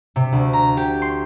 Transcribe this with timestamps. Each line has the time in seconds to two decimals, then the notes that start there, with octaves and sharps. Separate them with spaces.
0.16 C3
0.33 D2
0.53 A#5
0.77 G4
1.02 C6